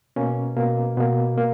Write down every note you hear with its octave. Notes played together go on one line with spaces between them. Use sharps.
B2 A#3 C#4
B2 A#3
B2 A#3 B3
A#3